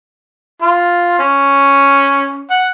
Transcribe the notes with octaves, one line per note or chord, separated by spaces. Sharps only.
F4
C#4
F#5